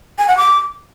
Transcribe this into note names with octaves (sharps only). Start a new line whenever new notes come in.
G#5
F#5
D6